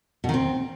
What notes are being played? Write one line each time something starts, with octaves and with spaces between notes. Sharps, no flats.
B2
D#3
C4